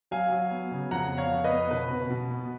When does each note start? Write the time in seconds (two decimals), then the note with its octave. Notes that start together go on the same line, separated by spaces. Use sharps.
0.11 F#3 F5 G#5
0.32 F#3
0.51 B3
0.72 C#3
0.91 F2 F#5 A#5
1.11 B3
1.17 C#5 F5
1.31 F2
1.44 B4 D#5
1.51 B3
1.71 B2 B4
1.91 B2
2.10 B2
2.31 B3